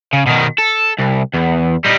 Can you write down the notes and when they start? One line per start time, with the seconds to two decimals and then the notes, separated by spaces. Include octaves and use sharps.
0.13 C#3
0.26 B2 D#3
0.58 A4
0.98 C2
1.34 E2
1.84 G3 D#4